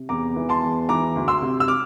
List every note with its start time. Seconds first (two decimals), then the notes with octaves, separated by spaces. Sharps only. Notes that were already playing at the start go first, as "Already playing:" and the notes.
Already playing: C3
0.09 E2 A#5 D6
0.36 E3
0.49 A5 C6
0.63 E2
0.89 E3 A#5 D6
1.16 D2
1.28 C6 E6
1.42 C3
1.60 E6
1.68 D6 F6